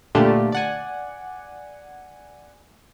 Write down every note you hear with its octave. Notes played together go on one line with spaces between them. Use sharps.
A#2 D3 A3 D4 F4 G4
D5 F#5 G#5